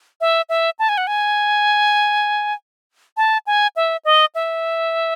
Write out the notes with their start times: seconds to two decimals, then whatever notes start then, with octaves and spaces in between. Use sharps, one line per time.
0.21 E5
0.49 E5
0.79 A5
0.89 G#5
0.98 F#5
1.07 G#5
3.17 A5
3.47 G#5
3.76 E5
4.05 D#5
4.35 E5